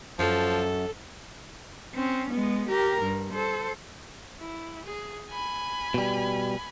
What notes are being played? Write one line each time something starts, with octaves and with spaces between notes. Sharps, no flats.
F#2 F3 A4
C4 C#4
G#3 B3
G4 A#4
G2
A4 C5
E4
G#4
G#5 B5
B2 G3